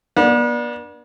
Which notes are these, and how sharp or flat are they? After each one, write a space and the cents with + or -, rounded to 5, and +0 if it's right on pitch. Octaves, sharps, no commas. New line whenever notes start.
B3 -40 D4 +10